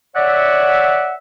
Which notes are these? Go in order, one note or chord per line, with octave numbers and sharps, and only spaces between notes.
C#5 D5 E5 F#5